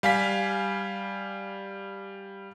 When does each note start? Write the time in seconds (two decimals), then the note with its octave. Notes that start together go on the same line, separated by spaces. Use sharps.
0.03 G3 F5 G#5 B6